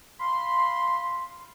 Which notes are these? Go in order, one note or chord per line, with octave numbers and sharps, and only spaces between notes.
F5 B5 C6